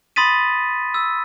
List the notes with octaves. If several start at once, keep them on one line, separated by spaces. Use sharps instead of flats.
B5 C6 D#6 A6 B6 D#7
E6